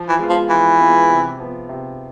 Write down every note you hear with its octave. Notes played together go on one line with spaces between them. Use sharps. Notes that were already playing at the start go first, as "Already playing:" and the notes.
Already playing: F3
E3
G#3 B3 F4
F3
E3 F3
G#3 B3 F4
C3
F3 B3
C3